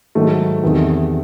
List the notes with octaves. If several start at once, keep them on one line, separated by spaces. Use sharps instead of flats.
G#2 D#3 F#3 A3
E2 C3 D#3